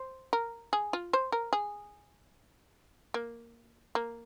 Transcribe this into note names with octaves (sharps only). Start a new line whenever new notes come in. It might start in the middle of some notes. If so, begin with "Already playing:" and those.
Already playing: C5
A#4
G#4
F4
C5
A#4
G#4
A#3
A#3